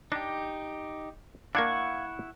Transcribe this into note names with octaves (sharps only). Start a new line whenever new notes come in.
D4 D#4 G4
A#3 D4 E4 F5 F#5 C#6 G#6